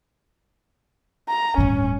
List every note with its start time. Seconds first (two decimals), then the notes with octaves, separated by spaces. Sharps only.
1.29 A#5
1.58 D1 G2 C#4